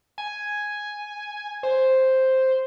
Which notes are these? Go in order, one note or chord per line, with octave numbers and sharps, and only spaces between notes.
G#5
C5